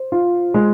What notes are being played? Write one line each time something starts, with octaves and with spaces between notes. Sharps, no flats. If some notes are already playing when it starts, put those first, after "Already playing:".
Already playing: C5
F4
G#3